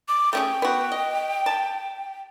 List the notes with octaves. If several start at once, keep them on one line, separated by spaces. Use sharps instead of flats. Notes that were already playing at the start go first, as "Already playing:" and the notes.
D6
A3 C#4 G#4 G5
B3 F#4
D#5
A5